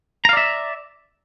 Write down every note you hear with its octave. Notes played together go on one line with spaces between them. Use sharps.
D5 E5 F5 A#5